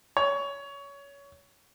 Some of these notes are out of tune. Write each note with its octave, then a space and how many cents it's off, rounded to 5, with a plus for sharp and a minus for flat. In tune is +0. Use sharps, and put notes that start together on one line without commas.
C#5 +20